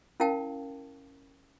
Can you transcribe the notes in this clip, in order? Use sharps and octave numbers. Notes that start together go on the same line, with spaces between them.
C#4 E4 A#4 F5 G5 A5